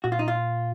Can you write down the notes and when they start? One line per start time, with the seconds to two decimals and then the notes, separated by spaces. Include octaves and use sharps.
0.04 A#2 F#4
0.12 F4
0.19 D#4
0.28 F4